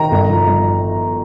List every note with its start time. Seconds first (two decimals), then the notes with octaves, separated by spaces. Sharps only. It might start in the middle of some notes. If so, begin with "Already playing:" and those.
Already playing: D#3 A#5
0.11 G1
0.29 F3
0.46 G1